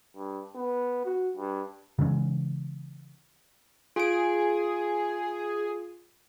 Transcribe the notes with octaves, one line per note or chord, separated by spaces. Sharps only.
G2
B3
F#4
G2
C#3 E3 G#3 C#4
F4 G#4 D7